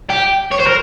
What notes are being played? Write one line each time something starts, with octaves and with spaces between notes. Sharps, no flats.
G4
C#5
C5
A#4